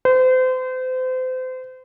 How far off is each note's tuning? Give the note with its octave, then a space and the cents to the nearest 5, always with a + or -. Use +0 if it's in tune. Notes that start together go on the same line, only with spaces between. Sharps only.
C5 -35